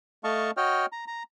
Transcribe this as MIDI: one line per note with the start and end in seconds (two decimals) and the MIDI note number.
0.24 0.51 57
0.24 0.51 75
0.24 0.51 77
0.24 0.51 81
0.24 0.51 85
0.57 0.86 66
0.57 0.86 73
0.57 0.86 75
0.57 0.86 79
0.57 0.86 89
0.92 1.05 82
1.07 1.23 82